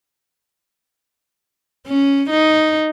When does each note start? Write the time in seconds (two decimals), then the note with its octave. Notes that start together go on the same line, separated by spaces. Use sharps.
1.87 C#4
2.30 D#4